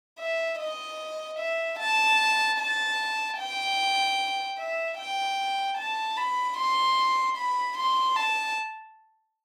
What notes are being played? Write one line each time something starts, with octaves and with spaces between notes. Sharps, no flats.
E5
D#5
E5
A5
A5
G5
E5
G5
A5
B5
C6
B5
C6
A5